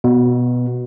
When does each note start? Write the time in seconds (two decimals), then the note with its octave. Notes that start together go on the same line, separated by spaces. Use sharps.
0.04 B2